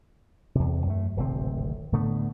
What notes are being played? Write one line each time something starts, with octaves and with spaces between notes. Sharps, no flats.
E2 C3
F#2 A3
D1 G#1 C3 C4
A2 D3 A3 B3